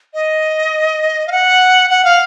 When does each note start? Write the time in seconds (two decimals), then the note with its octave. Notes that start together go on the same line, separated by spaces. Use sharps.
0.14 D#5
1.28 F5
1.32 F#5
1.90 F#5
2.05 F5